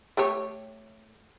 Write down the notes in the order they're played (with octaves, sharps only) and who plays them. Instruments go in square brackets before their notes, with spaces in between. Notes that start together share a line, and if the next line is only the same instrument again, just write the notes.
[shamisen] A3 G4 C#5